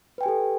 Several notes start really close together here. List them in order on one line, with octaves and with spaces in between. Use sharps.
B4 G5 G#5 G4 A4